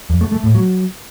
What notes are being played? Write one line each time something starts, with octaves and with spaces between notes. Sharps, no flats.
F2
A3
A3
A2
F#3